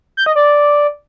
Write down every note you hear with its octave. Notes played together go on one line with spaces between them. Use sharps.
G6
D#5
D5